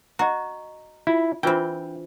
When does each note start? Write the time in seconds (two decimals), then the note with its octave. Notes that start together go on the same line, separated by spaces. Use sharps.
0.19 F#4 D#5 A#5
1.07 E4 F4
1.43 E3 C4 D4 F4 C5 G5